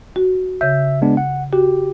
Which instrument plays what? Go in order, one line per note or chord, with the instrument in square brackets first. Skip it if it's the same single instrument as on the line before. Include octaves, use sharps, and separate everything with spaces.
[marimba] F#4
[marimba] C#3 G6 [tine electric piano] E5
[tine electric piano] G#3 B3 D4
F#5
[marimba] F#4 [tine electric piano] G4